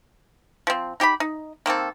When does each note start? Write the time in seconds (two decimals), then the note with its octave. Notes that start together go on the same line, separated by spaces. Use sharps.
0.67 F3 C4
1.00 D#4 G4 D5 B5
1.20 D#4
1.66 D#3 A#3 C4 A4